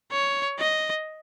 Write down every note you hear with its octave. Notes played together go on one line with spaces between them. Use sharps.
C#5
D#5